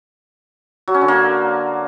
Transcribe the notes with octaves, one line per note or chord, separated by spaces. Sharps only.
F#3
C#4
D3
A#3